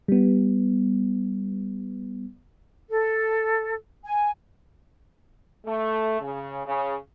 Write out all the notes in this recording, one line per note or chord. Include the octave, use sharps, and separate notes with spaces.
G3 B3
A4
G#5
A3
C#3
C#3